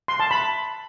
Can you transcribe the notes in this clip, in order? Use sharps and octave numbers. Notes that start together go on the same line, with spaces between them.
C6
A5
B5